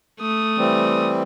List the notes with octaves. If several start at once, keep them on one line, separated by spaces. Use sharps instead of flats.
A3 D#6
E3 G3 C4